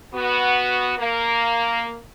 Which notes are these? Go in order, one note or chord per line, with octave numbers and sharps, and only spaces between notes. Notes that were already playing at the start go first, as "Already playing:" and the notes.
B3 F#4
A#3